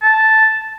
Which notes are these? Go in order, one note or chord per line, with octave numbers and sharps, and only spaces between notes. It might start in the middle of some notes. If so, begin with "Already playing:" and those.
A5